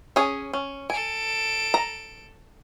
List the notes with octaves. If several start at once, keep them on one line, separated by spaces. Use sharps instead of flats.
C#4 G#4
C#4
A4 G#5 D7
A#5